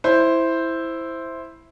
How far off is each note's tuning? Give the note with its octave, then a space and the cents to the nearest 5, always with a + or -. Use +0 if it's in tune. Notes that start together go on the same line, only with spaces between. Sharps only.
E4 +0 C5 +0